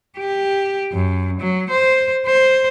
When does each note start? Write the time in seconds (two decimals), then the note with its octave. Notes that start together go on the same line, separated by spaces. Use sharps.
0.18 G4
0.93 F#2
1.40 F#3
1.70 C5
2.27 C5